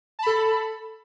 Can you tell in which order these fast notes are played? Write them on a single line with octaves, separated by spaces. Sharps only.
A5 B5 A4